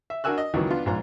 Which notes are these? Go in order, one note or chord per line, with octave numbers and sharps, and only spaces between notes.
E5
D4 F#4 A#4 G#5 E6 F#6
D#5
C#2 D#3 E3 F#3
B3 D4 F4
A#1 G#2 F4 A#5